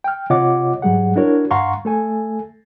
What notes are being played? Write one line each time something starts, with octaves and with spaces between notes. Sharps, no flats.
G5 F6
C3 F4 C#5 D#5 F#5 D6
G#2 F#3 G3 G#4 F#5
D4 E4 F#4 A#4 C#5
G2 F5 F#5 A#5 C6 C#6
A3 A4 G#5